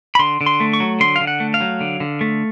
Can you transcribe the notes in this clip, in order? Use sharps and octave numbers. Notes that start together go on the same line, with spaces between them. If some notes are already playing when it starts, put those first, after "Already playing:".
B5
D3 C6
D3
C6
A3
C#6
F#3
D3 C6
F5
D3
F#5
A3
F5
F#3
D3
D3
A3